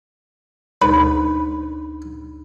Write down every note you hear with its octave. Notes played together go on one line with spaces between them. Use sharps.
D2 D#4 B4